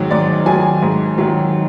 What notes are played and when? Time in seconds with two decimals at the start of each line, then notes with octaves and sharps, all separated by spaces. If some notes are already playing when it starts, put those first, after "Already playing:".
Already playing: G#2 D#3 F#3
0.11 G#2 D5
0.46 D#3 F#3 G#5
0.82 G#2
1.18 D#3 F#3